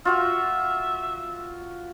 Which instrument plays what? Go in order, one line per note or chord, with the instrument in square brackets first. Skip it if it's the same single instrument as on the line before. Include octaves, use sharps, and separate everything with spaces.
[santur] F4 F#4 F5 [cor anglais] E5